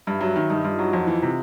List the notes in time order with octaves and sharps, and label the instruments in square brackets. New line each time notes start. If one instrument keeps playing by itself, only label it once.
[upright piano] G2 [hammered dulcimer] E4
[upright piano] F#3
D#3
[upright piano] G2 [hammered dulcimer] D#4
[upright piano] G2 [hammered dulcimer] F4
[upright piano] F#3 [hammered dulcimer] F#4
[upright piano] F2 [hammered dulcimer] F4
[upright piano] E3
C3